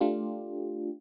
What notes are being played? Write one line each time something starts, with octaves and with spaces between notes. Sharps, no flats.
A3 D4 F4 G4